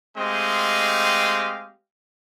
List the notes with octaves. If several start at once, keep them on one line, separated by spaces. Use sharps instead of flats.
G#3 A3 C4 G4 D#5 F5